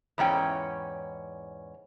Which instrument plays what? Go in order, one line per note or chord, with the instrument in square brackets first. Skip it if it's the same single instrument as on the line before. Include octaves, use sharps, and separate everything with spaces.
[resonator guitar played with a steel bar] E2 G#2 C#4 G5